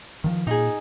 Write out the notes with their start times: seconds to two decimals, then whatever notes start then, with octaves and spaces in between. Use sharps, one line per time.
0.24 D#3 F3
0.47 A#2 D#4 G#4